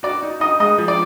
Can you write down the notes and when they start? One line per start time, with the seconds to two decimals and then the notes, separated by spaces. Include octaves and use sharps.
0.03 F#4 D5
0.23 D#4
0.40 D#4 D#5
0.60 G#3 D#5
0.78 F3
0.88 D5